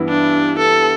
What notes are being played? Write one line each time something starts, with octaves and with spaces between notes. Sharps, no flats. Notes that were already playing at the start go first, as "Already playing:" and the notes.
Already playing: G2 E3 B3 E4
D4
A4